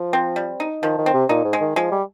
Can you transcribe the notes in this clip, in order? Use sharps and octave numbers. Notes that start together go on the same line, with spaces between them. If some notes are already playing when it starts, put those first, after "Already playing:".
Already playing: F3
C4
G3
D#4
D#3 F3
D#3
C4
C3
A#2 D#4
G#2
G#3
D#3
F3 G#3
G3